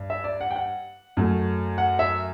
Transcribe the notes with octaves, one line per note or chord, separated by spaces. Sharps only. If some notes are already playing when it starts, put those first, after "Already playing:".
Already playing: G2
E5
D5
F#5
G5
F#5
F#2 F#3 A3
F#5
E5